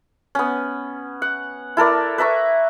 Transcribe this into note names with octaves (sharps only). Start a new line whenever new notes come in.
B3 C#4
F#5
E4 A4 A#4 D5
B4 E5 A#5 C#6